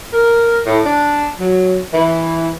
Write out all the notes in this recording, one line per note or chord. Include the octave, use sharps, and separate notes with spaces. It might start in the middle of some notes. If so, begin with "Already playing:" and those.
A#4
A2
D4
F#3
E3